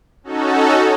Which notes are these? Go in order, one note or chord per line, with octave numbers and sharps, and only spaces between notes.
C#4 D#4 F#4 A4